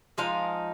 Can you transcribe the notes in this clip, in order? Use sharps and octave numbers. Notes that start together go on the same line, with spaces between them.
F3 G#3 D#4 F5